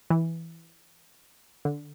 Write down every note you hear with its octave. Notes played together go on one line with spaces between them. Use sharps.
E3
D3